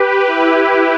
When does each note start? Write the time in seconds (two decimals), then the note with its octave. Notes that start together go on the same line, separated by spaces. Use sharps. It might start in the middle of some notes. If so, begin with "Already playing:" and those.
Already playing: G4 B4
0.27 E4 G4